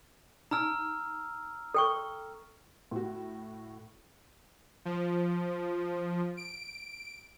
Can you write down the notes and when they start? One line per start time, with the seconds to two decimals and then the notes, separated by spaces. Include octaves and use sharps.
0.51 D#4 G#5 A#5 E6 F6
1.74 A4 G5 C#6
2.91 A2 F#4
4.85 F3
6.37 D7